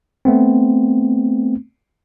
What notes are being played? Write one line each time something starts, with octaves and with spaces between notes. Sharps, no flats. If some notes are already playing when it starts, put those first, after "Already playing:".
A3 B3 C4